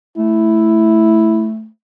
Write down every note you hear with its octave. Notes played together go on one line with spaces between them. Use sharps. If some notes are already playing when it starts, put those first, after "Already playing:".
A3 E4